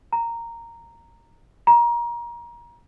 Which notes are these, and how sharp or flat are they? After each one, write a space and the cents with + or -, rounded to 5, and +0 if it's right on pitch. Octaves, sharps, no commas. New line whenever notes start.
A#5 -5
A#5 +25